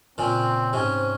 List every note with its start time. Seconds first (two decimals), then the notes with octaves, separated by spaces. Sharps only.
0.18 A#2 C#3 C4
0.73 G#2 C3 C#4